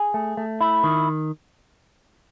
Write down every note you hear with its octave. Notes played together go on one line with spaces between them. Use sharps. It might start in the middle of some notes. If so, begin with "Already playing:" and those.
Already playing: G#4
A3
A3
E4
D#3